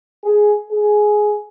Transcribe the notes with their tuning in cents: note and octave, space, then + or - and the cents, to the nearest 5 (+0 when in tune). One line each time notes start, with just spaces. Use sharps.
G#4 +10
G#4 +10